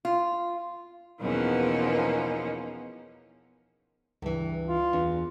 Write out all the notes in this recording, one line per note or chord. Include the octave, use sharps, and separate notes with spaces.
F4
E2 B2 F3 A#3 C#4 D#4
C#2 G2 E3
F4
E2 D4